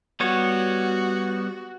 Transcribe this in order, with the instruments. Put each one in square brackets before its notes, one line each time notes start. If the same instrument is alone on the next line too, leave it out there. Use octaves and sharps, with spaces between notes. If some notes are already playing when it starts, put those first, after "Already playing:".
[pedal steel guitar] G3 B3 C#5 [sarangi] F#4